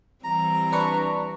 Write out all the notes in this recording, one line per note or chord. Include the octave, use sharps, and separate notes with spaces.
E3 G3 C4 A#5
D4 B4 C#6